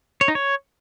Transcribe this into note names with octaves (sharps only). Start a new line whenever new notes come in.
C#5
D#4
C#5